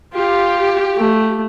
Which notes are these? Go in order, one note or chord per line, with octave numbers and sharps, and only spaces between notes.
F4 G4
A3